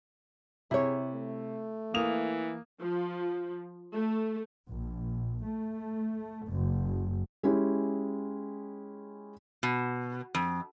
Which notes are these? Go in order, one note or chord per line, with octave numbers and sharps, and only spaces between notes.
C3 E4 G#4 C#5
A3
E3 A#3 D#6 F7
F3
A3
A#1
A3
F#1
G#3 C#4 E4 G4
B2
F2